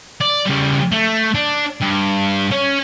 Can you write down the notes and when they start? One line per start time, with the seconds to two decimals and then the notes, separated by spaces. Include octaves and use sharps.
0.21 D5
0.46 C#3 G3
0.92 A3
1.35 D4
1.81 G2
2.52 C#4